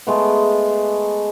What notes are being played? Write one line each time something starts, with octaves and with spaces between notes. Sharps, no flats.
G#3 A3 B3